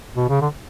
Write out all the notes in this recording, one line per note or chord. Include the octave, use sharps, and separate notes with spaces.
B2
C#3
D3